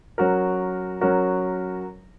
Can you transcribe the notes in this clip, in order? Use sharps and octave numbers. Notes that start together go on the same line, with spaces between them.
F#3 C#4 F#4 A#4
F#3 C#4 F#4 A#4